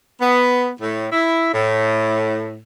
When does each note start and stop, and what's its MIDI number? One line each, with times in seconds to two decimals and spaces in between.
0.21 0.70 59
0.81 1.07 45
1.12 1.50 64
1.54 2.60 45